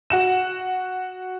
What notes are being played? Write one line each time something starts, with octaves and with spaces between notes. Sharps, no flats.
F#4 F#5 E7